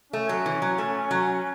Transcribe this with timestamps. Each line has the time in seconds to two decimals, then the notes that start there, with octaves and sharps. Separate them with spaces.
0.12 A3 C#4
0.29 F#3
0.46 E3
0.62 F#3
0.78 A3
1.11 F#3